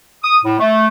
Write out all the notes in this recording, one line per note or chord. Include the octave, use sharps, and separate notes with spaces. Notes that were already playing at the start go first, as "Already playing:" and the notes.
D#6
A2
A3